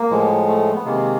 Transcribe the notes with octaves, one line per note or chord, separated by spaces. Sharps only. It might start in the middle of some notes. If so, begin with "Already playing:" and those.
Already playing: A#3
A2 F3 G#3
A3
B3
C3 D#3 G#3 A#3